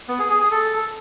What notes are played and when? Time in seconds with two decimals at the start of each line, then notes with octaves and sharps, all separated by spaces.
0.08 B3
0.19 G#4
0.30 G#4
0.40 G#4
0.51 A4